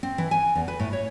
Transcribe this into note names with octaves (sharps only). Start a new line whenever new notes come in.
C4
E3
G#5
E2
B4
A2
C#5